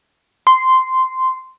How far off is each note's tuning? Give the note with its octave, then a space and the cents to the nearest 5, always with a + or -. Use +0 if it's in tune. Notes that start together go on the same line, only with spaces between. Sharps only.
C6 -10